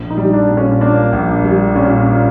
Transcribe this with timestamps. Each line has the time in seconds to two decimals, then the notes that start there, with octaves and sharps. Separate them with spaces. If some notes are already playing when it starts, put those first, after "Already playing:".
Already playing: A#1
0.10 D#4
0.18 G3
0.33 D4
0.49 A#2
0.57 C#4
0.81 A#3 D4
1.13 A#1
1.44 G3
1.75 A#2 C#4
2.06 A#3